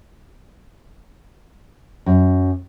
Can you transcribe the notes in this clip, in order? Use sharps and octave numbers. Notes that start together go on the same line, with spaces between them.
F#2